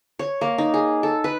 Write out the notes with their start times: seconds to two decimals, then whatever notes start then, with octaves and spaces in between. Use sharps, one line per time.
0.19 C#5
0.41 A#3
0.58 D#4
0.74 G#4
1.03 A4
1.24 B4